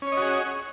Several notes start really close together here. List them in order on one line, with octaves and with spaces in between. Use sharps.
C#4 C#5 D#5 F#4 G#4